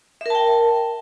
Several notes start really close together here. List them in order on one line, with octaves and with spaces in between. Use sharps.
E5 A#4 A5 G5